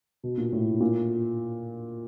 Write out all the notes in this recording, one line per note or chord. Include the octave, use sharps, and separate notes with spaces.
B2
A#2
A2
A#2